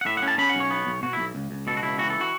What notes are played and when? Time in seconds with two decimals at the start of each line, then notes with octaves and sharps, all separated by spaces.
0.01 F#5
0.06 A2 E5
0.17 F#5
0.22 C#4
0.28 A5
0.38 C#4 B5
0.49 F#5
0.55 B1
0.60 C#5
0.70 B3
0.87 B1
1.03 B2 F#4
1.13 E4
1.18 B1
1.35 C#2
1.51 C#2
1.67 B2 A4
1.77 F#4
1.83 C#2 E4
1.98 E3 F#4
2.10 A4
2.21 F#4